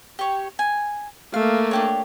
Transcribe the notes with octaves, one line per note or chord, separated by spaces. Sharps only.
G4 C#5
G#5
A3 A#3 F5
D4 G4 C#5